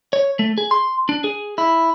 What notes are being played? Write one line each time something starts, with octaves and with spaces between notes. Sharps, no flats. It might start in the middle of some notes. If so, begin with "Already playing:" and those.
C#5
A3
G#4
C6
D4
G#4
E4